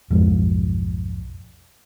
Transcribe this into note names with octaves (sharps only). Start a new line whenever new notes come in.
B1 F2 G#2